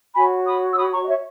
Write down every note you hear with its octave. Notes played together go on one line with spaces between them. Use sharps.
F#4 C#5 G#5 B5
B5 D#6
E6
B5 D#6
A#5 C#6
D#5
C#5 E5